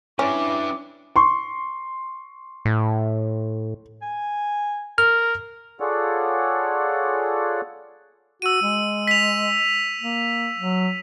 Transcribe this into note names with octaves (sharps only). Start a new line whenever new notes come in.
C#4 D4 E4 B4 D6
C6 C#6
A2
G#5
A#4 F6
F4 G#4 A4 C#5 D5 F#5
F#4 E6 D#7
G#3
B6 F7
A#3
F#3